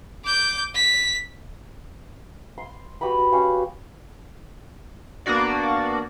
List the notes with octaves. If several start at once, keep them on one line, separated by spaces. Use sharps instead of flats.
D6 G6
B6
C6
F#4 G4 B4 B5
F#4
C#4 F#4 G4 F5
A#3 B3 D4 F#4 D5